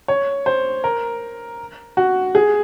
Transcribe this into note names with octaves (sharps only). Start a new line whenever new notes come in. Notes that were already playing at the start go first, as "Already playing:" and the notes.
C#5
C5
A#4
F#4
G#4